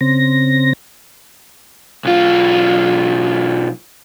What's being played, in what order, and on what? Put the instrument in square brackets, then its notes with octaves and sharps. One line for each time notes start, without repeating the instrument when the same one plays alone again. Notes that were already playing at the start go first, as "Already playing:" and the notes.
[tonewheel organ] C#3 C4 A#6
[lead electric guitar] B1 F4